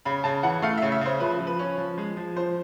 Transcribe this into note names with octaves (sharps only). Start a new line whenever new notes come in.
C#3 B5
C#3 A5
E3 F#5
A3 F5
E5
C#3
E5
C#3 C5
F3 B4
F3
B4
C#4
F3
G#3
F3
F3 C5